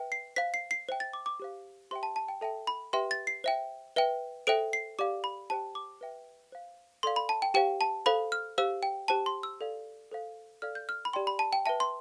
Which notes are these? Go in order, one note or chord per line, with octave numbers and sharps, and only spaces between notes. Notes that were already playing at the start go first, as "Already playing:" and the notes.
Already playing: B4 E5 G5
C7
C5 F5 B6
C7
C7
C5 E5 G5
A6
D6
D6
G4 C5 F5
G4 C5 E5 G5 C6
A5
A5
G5
A4 E5 G5 A5
B5
G4 B4 E5 G5 C6
A6
C7
C5 E5 G5
B4 E5 G5
A4 C5 E5 G5 D7
C7
G4 D5 F5 D6
B5
G4 C5 G5 A5
D6
B4 E5 G5
C5 F5
A4 D5 F5 C6
B5
A5
G5
G4 C5 F5 G5
A5
A4 C5 F5 B5
F6
G4 C5 F5 E6
G5
G4 C5 G5 A5
C6
E6
A4 D5 F5
A4 C5 F5
A4 D5 F5 F6
G6
F6
B5
G4 D5 G5 C6
B5
A5
G5
B4 E5 G5 A5
C6